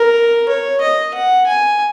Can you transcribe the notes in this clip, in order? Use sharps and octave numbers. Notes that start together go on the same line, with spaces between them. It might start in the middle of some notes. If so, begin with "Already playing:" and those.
Already playing: A#4
C#5
D#5
F#5
G#5